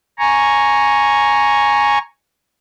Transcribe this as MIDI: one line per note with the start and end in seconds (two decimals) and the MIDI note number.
0.19 1.98 80
0.19 1.98 82
0.19 1.98 85